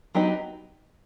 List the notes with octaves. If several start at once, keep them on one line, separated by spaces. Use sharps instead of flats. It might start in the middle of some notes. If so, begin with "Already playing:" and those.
F#3 B3 D#4 G4